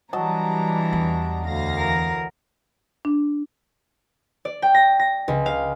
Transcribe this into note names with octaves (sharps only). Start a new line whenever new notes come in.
E3 F#3 G3 D4 D#5 A5 A#5
E2
D2 F5 A#6
E3 A#4
D4
D5
G5
A#6
A#6
C#2
F5